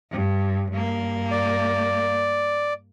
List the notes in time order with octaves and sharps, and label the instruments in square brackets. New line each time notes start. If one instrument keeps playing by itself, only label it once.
[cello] G2
G2 A#3
[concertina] D5